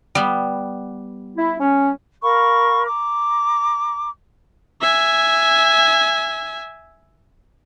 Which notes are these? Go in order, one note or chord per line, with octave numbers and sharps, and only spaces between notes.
G3 B3
E4
C#4
A#4 F5 B5 C#6
A#5 D6
E5 G#5